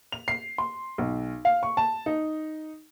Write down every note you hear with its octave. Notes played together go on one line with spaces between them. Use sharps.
F7
C7
C6
B1
F5
C#6
A5
D#4